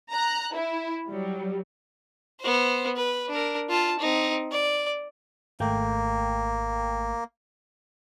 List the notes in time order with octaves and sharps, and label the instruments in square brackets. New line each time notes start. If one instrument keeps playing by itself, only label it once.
[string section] A#5 F#6
E4
F#3 G3
[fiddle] B3 C5
B4
D4 A#4
F4 A5
C4 D#4
D5
[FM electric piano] G#1 A3 G5 [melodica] A#3